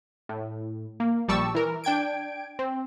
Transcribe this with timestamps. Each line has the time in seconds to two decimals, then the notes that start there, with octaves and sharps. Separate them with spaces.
0.29 A2
1.00 A#3
1.28 A#1 G3 D5 A5 C#6 E6
1.55 E3 A#4
1.84 D4 G5 G#6 D7
2.59 C4